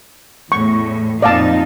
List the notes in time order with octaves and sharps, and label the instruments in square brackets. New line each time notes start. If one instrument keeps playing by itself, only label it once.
[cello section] E2 A2 [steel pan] C#6
[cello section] F2 A#2 D#4 [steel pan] D5 F5 A5